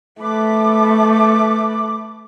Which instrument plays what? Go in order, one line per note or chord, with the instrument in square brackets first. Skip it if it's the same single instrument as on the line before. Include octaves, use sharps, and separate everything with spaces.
[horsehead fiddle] A3 [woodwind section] B4 B5 D6